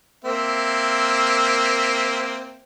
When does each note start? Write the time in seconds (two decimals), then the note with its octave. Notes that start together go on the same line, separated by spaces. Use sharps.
0.25 A#3 C4 E5